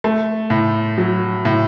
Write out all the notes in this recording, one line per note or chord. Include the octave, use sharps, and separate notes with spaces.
A3
A2
F#3
A2